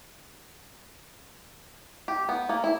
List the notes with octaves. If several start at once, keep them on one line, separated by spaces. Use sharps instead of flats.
G4
B3
A#3
E4